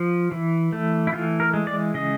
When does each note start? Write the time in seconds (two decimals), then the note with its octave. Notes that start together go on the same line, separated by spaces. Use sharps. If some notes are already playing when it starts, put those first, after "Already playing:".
Already playing: F3
0.32 E3
0.73 A3
1.07 E4
1.13 E3 F4
1.40 A#4
1.54 G#3
1.67 D5
1.94 C#3 D#5